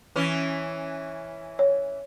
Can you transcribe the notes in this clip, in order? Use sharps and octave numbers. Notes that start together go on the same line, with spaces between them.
E3 C#4
C#5